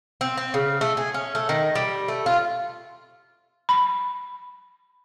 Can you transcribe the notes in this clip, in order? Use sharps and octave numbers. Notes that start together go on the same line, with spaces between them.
C4
C4
C#3
A3
G#4
C#4
A3
D#3
G3
A3
F4
B5